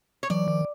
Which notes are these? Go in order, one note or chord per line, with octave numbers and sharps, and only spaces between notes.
C#5
E3 F#3 D5
D#3 F3